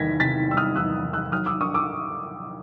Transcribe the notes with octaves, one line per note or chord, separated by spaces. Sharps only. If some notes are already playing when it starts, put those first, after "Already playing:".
Already playing: E2 C3 D#3 G3 G#6 A#6 B6
C3 A6 B6
G3 E6
D#6 F6
E2 E6 F#6
D#3
E6 F#6
F#3 D#6 F6
D6 E6
D4 C#6 D#6
D6 E6